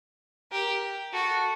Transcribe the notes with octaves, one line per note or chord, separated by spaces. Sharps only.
G4 A#4
F#4 A4